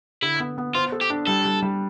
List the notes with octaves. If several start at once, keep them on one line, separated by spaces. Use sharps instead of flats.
D3 E4
B3
B3
F4 C5
A4
G4
D4
G3 A4
G3
G3